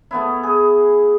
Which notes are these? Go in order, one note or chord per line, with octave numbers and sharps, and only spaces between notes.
A3 B3 E4
G#4